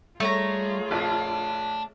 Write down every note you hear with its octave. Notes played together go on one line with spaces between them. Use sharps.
G3 A3 F4 G#4 C#5 A#5
A#1 F2 D5 A5